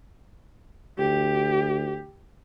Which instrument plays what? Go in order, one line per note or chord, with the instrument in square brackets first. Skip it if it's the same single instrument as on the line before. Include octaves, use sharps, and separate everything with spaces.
[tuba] D2 [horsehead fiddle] G4